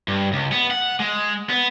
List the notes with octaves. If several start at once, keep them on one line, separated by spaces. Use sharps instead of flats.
G2
C#2
B3
F#5
G#3
B3